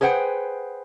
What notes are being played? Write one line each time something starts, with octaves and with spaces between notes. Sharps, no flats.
G#4 B4 C5 F#5 G5